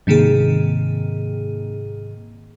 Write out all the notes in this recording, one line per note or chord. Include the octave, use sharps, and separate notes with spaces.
G#2 C3 D#3 A#3 G#4